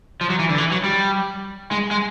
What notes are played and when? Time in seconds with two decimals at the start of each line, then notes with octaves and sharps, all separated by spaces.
0.21 F3
0.30 F#3
0.40 E3
0.50 D3
0.58 E3
0.72 F#3
0.84 G3
1.71 G#3
1.91 G#3